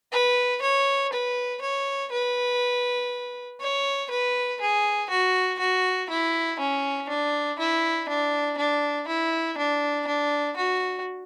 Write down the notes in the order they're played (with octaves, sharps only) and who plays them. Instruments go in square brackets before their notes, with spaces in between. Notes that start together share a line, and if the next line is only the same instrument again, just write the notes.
[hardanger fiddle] B4
C#5
B4
C#5
B4
C#5
B4
G#4
F#4
F#4
E4
C#4
D4
E4
D4
D4
E4
D4
D4
F#4